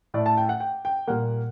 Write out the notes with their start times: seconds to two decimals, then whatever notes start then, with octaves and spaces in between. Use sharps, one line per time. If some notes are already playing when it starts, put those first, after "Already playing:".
0.14 A2 A3 D5
0.26 A5
0.37 G5
0.49 F#5
0.60 G5
0.85 G5
1.07 A#2 G3 A#3 F#5